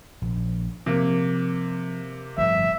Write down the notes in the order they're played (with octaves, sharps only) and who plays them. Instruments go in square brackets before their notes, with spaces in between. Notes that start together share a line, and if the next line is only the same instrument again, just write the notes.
[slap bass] A#1
[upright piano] C3 A#3 [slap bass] F3
[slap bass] G1 A2 F3 [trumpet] E5